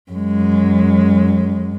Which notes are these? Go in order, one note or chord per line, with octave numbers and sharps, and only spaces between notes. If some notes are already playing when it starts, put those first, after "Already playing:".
F#2 G#3